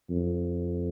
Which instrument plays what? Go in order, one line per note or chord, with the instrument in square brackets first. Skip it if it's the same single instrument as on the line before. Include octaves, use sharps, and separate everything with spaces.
[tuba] F2